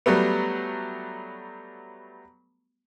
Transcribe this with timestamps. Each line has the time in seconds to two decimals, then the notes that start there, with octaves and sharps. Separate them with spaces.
0.06 F#3 G3 A3 B3